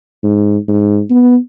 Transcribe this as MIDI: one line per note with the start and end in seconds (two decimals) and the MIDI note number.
0.24 0.57 44
0.68 1.02 44
1.10 1.37 59